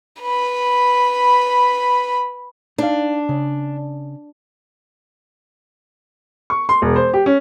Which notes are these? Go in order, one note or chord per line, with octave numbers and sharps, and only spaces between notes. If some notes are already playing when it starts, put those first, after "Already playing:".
B4 B5
D4 D#4 F5
C#3
C#6
C6
E1
C5
G4
C#4